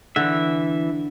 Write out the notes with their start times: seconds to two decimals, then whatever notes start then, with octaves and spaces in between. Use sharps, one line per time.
0.16 D3 E3 E5